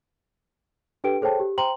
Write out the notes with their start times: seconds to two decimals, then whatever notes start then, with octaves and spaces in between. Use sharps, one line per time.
1.04 D4 G4 A4 B4 G5 D7
1.21 G#4 A4 C5 C#5 G5 A5
1.40 G4
1.58 C5 G5 A#5 C6 F#7